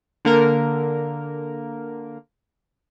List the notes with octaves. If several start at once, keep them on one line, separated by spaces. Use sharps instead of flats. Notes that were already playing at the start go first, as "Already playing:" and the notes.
D3 A#3 A#4